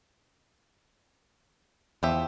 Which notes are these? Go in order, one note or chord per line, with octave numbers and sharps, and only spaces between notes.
E2 F3 G4 E5